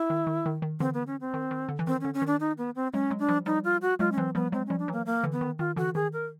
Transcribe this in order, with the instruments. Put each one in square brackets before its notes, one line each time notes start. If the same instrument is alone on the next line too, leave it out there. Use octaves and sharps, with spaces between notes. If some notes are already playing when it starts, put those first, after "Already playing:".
Already playing: [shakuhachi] E4
[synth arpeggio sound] D#3
D#3
D#3
D#3
[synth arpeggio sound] D3 E3 [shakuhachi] C4
[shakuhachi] B3
C#4
C4
[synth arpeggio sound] D#3
D#3
D3
E3
[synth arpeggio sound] D#3 [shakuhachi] C4
[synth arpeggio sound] D3 [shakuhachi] C#4
[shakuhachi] C#4
[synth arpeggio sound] D#3 [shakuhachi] D4
[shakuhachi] D#4
B3
C4
[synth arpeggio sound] F#3 G#3 [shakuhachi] C#4
[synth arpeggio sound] F#3 G#3
[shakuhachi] D4
[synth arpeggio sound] F3 G3
[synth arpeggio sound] F3 G3 [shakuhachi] D#4
[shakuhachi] F4
F#4
[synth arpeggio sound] F#3 G#3 [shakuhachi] F4
[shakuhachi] C#4
[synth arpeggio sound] E3 F#3 [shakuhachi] C4
[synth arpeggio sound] F3 G3 [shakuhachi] B3
[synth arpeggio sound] F#3 G#3 [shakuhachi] C4
[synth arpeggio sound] F3 G3 [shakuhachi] C#4
[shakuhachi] D4
[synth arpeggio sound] E3 F#3 [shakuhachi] A#3
[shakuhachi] A#3
[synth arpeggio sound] D3 E3
[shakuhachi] B3
[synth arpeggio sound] D#3
[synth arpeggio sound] D#3 [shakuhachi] F4
[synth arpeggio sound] D3 E3 [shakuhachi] F#4
[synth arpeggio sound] D#3 [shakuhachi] G#4
[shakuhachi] A#4